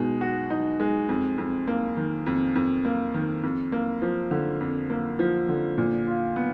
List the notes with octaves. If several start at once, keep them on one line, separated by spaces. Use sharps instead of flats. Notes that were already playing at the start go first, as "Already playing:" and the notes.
Already playing: B2 G#3 D#4
F#4
D#4
G#3
F2
F2
A#3
D#3
F2
F2
A#3
D#3
F2
A#3
F3
D3
F2
A#3
F3
D3
A#2
F4
B3